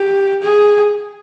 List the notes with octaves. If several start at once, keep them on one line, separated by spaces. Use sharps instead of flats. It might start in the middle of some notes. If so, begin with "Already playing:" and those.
Already playing: G4
G#4